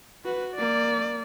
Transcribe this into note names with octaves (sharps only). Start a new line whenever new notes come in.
F#4 B4
A#3 D5